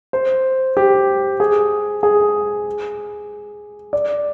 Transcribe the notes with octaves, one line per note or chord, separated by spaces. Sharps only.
C5
G4
G#4
G#4
D5